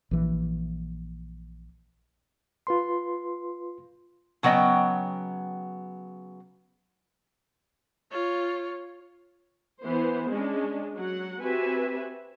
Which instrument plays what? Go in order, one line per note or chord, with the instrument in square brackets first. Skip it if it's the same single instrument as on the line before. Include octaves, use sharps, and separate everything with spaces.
[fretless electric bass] A#1 E3
[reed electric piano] F4 B4 C6
[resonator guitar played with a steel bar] C#3 F#3 B3 D#5 G5
[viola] F4 C#5
[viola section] E3 B3 C5
G#3 C#4 D4
F#3 F#5
C4 F#4 G4 B4 E5 G#5